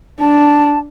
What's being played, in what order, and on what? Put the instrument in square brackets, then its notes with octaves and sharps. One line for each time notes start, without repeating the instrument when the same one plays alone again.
[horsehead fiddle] D4 [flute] A5